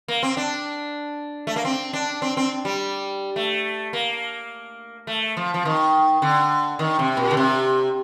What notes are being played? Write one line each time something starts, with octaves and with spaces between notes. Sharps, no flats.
A#3
C4
D4
A3
A#3
C4
D4
C4
C4
G3
A3
A#3
A3
F3
F3
D#3
D3
D#3
C3
A#2
D3
C3